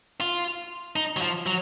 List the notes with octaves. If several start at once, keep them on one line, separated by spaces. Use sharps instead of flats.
F4
D#4
F#3
F3
F#3